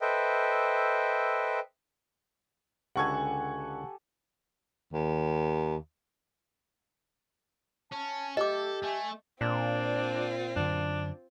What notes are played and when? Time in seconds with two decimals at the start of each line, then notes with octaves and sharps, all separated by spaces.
0.01 A4 B4 C5 D#5 E5 G5
2.96 C#2 D3 G4 A4 F#5 G#5 C#6 G#6
4.93 D#2
7.92 C#4 A5
8.37 A3 G4 A4 D#5 D6
8.84 A3 G#5
9.41 A#2 C4 D4 F4
10.56 F#2 D3 D4